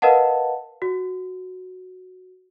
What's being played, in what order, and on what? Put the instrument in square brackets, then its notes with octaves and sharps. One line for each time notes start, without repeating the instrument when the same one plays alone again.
[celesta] A#4 B4 D#5 F5 F#5 A5
F#4